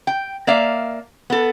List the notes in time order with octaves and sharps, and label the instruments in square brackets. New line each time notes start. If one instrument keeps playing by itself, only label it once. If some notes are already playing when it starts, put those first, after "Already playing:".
[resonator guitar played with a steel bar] G5
A#3 D5 E5 F5
B3 A4